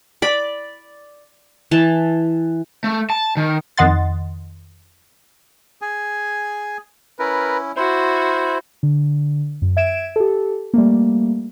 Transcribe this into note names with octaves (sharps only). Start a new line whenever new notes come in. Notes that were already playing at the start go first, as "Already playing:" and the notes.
D5 B5
E3 A5
A3
A5
D#3
F2 D#3 D#5 F#5 C6 A6
G#4 G#5
C#4 E4 A#4 B4
E4 F#4 C5 C6
D3
F#2
E5 G#6 D7 E7
G4 A4
G3 A3 A#3